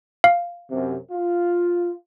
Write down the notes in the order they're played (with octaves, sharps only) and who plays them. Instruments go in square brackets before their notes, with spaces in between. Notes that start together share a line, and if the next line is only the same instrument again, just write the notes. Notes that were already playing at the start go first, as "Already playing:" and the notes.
[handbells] F5
[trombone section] F#2 C3
F4